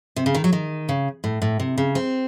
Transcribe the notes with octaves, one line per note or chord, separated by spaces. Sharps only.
C3
C#3
D#3
F#3
D#3
C#3
A2
A2
C3
C#3
C4